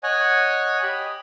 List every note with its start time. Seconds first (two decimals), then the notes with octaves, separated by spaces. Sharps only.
0.03 C#5 D#5 F#5 G#5
0.83 G4 D#5 B5